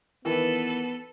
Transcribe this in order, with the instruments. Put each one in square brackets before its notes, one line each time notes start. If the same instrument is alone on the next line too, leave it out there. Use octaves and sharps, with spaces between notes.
[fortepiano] D#3 E3 [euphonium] B3 [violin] A4 B4